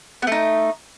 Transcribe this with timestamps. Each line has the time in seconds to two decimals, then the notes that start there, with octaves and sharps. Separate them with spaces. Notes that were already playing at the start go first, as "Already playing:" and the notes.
0.22 B3
0.27 A3
0.32 D#4